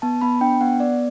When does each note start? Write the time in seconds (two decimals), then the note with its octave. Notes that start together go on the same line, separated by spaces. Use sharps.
0.02 B3 A5
0.21 B3 B5
0.41 D4 G5
0.61 B3 F#5
0.79 B3 D5